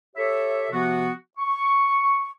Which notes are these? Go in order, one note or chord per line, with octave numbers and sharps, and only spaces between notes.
G4 A4 C#5 E5
C3 F3 B3 F#4
C#6